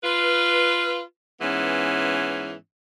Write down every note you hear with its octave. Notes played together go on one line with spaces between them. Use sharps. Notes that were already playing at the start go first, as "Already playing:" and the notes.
F4 B4
G#2 E3 B3 C#4